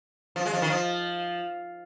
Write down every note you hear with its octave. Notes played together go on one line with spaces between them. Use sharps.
F3
G#3
F3
D#3
F3